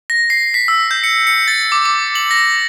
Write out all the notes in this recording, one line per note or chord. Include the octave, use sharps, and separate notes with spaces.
A#6
C7
B6
E6
G6
C#7
C#7
A6
D6
D6
F#7
A#6